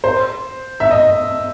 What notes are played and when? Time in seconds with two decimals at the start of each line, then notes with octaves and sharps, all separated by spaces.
0.04 C5
0.80 E5
0.91 D#5